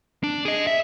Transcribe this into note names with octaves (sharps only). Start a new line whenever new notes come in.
D4
G#4 D#5
E5